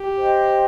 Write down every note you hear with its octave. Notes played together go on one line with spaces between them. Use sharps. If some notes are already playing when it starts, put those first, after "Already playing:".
Already playing: G4
C5 D#5 G5